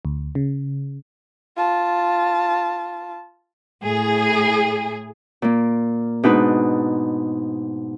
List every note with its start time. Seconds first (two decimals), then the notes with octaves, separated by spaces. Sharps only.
0.05 D2
0.35 C#3
1.56 F4 A5
3.83 A2 G#4
5.42 A#2 A#3
6.23 G#2 B2 D4 D#4 B4